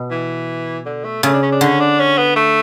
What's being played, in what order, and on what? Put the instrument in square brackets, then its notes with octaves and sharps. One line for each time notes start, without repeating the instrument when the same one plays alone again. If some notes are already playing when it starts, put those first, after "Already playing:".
Already playing: [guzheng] B2
[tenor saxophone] E3
D3
A3
[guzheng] C#3 [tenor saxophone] A3
[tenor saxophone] D4
C#4
D4
[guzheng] D3 [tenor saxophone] C#4
[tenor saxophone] D4
C#4
B3
A3